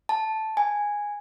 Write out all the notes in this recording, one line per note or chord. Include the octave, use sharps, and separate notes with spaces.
A5
G#5